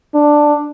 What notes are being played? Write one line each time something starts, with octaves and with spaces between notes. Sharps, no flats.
D4